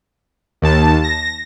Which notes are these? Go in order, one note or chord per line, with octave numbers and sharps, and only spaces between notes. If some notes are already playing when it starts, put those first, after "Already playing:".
D#2 A5
A#6